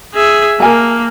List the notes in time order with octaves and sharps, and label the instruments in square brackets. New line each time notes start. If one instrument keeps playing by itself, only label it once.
[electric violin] G#4 E5
[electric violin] A#3 [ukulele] A#4 G#5 A5